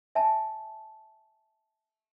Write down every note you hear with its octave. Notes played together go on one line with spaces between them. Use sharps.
E5 G#5 A5